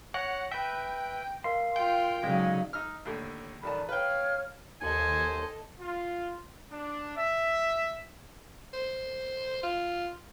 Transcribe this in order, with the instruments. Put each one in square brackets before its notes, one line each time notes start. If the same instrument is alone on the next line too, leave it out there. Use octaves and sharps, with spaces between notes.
[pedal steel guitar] C#5 [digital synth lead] F#5 [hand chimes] A#6 D7
[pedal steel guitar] B4 E5 [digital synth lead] G5
[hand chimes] A#4 D#5 F5 [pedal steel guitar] C6
[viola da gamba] F4 [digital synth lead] G5
[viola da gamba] C#3 F#3 D#4 [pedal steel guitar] G#3 [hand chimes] A4 D5 F5
[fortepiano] D#4 E6 F6
D#2 A2 D3
[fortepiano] A1 D#3 A5 [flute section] D5 B5
[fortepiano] B4 G5 [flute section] C#5 F5 F6
[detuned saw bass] D#2 [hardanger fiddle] A4 D#5 [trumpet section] C5 G#5
[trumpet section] F4
D4
E5
[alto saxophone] C5
F4